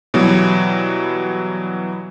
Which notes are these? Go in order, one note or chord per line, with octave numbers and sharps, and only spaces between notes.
B2 E3 F#3 G3